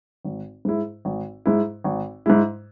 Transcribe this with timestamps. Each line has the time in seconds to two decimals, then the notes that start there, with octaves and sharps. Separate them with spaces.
0.25 G#1
0.65 G#2 G#3 E4
1.05 G#1
1.46 G#2 G#3 E4
1.84 G#1
2.26 G#2 G#3 E4